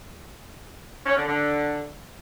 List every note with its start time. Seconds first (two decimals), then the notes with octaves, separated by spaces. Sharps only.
1.06 C#4
1.16 D3
1.26 D3